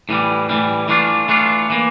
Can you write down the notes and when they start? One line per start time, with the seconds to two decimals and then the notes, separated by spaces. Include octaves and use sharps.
0.09 A2 E3 G3
0.49 A2 E3 G3
0.88 E3 A3 D4 F4
1.28 E3 A3 D4 F4
1.70 E3 A#3